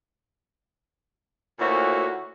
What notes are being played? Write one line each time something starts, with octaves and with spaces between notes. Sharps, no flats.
D2 A#2 E4 F#4 C5 C#5